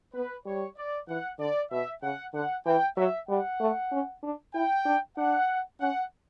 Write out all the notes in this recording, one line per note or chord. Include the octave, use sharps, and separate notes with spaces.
B3 B4
G3 C#5
D5
E3 F#5
D3 D5
B2 E5
C#3 F#5
D3 F#5
E3 G5
F#3 E5
G3 F#5
A3
C#4
D4
E4 G5
D4
D4 F#5
C#4 F#5